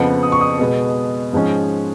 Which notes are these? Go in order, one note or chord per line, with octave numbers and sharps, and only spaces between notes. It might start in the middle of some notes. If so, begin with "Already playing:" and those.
Already playing: F2 C#3 F3 B3 F#5
D#6
C#6
D#6
B2 G#3 B3
G#2 F3 G#3 C#4